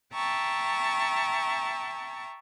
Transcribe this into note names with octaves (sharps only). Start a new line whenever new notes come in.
E5 G5 A5 A#5 C#6